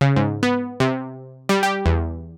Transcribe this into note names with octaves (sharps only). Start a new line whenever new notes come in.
C#3
G#2
B3
C3
G3
G4
E2